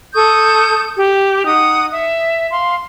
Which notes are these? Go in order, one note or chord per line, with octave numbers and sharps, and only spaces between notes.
A4 C#6 D#6 G6
G4
D#4 F#5 D#6
E5
F5 C6